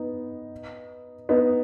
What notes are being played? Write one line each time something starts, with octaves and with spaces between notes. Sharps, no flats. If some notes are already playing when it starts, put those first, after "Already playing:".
Already playing: B3 D#4
B3 D#4